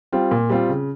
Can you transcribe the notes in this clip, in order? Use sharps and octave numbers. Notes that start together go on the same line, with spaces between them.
G3 C4 F4
A#2
G3 C4 F4
C#3